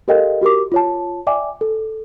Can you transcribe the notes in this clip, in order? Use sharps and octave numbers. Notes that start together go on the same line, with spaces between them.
G4 A4 A#4 D#5 F5 G5
F#4 G4 A#4 D6
F4 C#5 A5
D5 E5 G5 G#5 D6
A4